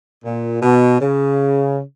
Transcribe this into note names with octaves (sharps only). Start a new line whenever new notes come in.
A#2
B2
C#3